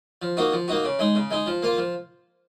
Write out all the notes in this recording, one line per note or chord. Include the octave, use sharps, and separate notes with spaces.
F3
A#3 D#4 F#4
F3
A#3 D#4 F#4
C#3
G#3 D#4
C#3
G#3 D#4
F3
A#3 F4
F3